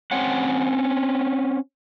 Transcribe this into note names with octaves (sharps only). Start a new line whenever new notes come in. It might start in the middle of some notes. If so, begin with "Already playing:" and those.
C4 C#4 F#5